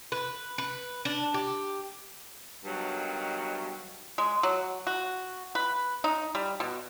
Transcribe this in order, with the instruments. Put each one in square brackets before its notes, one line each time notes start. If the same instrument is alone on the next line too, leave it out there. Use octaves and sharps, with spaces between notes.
[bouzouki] B4
B4
D4
G4
[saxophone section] G2 B2 D#3 F#3
[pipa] G#3
F#3
F#4
B4
D#4
G3
B2